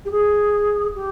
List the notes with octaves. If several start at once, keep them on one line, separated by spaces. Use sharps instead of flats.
G4
G#4
G4